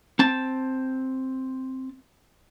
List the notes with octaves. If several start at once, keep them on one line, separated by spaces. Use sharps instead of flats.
C4 A5